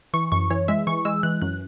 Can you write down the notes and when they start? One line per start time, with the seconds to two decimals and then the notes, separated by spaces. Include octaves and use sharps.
0.13 E3 C#6
0.32 F#2 C#6
0.50 E3 C#5
0.68 G#3 E5
0.87 E3 C#6
1.05 G#3 E6
1.23 E3 F#6
1.42 F#2 F#6